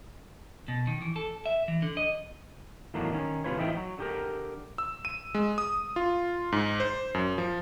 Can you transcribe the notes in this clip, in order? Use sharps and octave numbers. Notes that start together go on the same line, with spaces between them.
B2
D#3
E3
A4
E5
E3
D3
D#5
E2 A2 D#3 F#3 A#3 D4
D#3 C#4
C3 F#3 F4 B4 C#5
A2 E3 F3 D#4 E5 G5
F#3
D3 G4 A#4
E6
D#7
G#3
D#6
F4
G#2
C5
F#2
F3